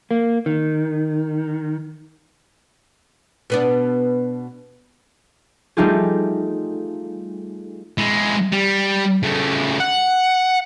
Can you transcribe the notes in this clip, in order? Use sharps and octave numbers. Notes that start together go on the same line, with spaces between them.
A#3
D#3
B2 B3 D4
G3 A3 D#4 F4 G4 G#4
G#3 E4
G3
C#3 A3
F#5